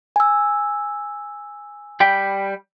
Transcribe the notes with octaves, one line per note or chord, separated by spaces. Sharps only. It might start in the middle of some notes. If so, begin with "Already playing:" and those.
G#5 E6
G3 G5 B5